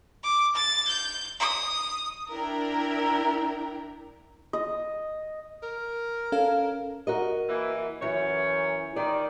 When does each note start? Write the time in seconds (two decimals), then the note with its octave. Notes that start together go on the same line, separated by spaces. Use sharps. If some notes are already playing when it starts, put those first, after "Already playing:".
0.22 D6
0.54 A6
0.87 G6
1.38 D#6
2.32 D4 E4 A#4 G5
4.53 D#5
5.63 A#4
6.32 C#4 A4 F5
7.07 F#4 A#4 D#5
7.49 E3 A#3
8.02 F#2 E3 C#5
8.96 D#3 D5